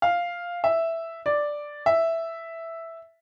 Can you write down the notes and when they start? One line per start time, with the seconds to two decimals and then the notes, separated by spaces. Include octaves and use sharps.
0.02 F5
0.64 E5
1.26 D5
1.86 E5